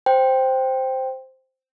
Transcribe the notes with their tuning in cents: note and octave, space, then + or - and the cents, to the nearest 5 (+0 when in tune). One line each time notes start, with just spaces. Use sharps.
C5 +0 G5 +0